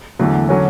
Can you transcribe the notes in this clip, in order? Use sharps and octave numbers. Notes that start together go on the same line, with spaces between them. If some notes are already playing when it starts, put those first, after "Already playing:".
E2 D3 F#3 A3
D3 F#3 C#4